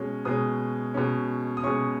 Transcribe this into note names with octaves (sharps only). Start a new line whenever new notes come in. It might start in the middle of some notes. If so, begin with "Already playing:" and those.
Already playing: B2 G#3 C#4
B2 G#3 C#4 D#6
B2 G#3 C#4
D#6
B2 G#3 C#4 C#6